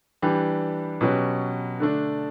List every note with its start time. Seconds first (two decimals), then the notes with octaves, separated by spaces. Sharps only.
0.22 E3 G3 D4 G4 B4
1.01 B2 F#3 C#4 G4 B4
1.80 D3 A3 D4